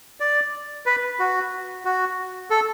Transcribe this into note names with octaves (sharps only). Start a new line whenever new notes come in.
D5
B4
F#4
F#4
A4